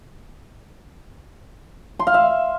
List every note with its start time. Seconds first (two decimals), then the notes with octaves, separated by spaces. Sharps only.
1.99 C6
2.07 F5
2.14 E5